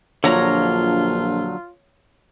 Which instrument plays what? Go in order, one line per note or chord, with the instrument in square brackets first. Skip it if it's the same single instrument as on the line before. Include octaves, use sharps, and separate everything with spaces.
[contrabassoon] A#1 [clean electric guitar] D3 F#3 [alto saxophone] F4 [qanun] C#5 A#5